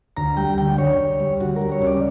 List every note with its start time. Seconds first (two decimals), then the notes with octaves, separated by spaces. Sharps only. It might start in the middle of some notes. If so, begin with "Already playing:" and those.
0.17 D2 A#5
0.37 G3 G5
0.58 D3 G5
0.78 D2 C#5
0.99 D2
1.20 G3
1.40 D2 F#4
1.56 A#4
1.62 G3
1.72 C#5
1.82 C#3 D5